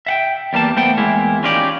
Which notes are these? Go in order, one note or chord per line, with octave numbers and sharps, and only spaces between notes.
E5 F#5 G5
E2 G3 A#3 A5
A3 B3 C5 F#5 G5
E2 G#3 A#3 E4
C#4 D#4 F4 G4 D5